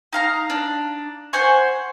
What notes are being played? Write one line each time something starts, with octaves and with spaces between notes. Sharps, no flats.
D#4 F5 A#5
D4
C5 F#5 G#5 C#6